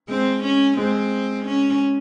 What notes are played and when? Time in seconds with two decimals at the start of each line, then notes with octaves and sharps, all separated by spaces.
0.08 G#3 C4
0.43 C#4
0.77 G#3 C4
1.45 C#4